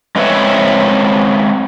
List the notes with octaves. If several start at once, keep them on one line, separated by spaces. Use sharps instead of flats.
G#3 C4 E4 B4 C#5 E5